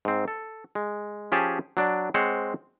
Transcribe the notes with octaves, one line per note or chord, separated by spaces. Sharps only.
G#2 C4
A4
G#3
F3 C#4 G4 G#4 A5
F#3 D4 D5
G#3 C4 C5 C#5 F#5